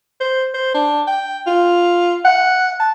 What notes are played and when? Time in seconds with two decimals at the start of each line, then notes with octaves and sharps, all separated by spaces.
0.20 C5
0.54 C5
0.74 D4
1.07 G5
1.47 F4
2.25 F#5
2.79 A5